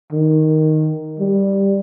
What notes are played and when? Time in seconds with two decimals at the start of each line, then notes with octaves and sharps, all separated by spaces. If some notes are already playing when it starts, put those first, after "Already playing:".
0.13 D#3
1.19 G3